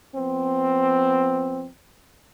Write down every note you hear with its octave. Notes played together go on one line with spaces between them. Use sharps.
F3 B3 C4